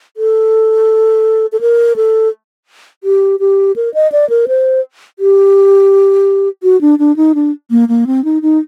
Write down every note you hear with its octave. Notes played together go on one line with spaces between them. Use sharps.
A4
A4
A#4
A4
G4
G4
A#4
D#5
D5
A#4
C5
G4
F#4
D4
D4
D#4
D4
A#3
A#3
C4
D#4
D#4